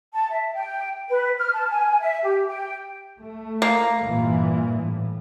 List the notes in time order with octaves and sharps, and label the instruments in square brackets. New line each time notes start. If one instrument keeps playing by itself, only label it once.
[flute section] A5
E5
G5
B4
F6
A5
G#5
E5
G4
G5
[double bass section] A3
[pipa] A#3
[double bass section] G2 A#2 E3
A2